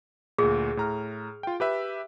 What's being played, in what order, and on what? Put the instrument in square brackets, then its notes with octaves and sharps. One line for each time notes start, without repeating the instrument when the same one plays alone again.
[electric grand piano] D2 A#2 [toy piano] G#4
[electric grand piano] A2 A#5 F6
F4 G5
G4 B4 E5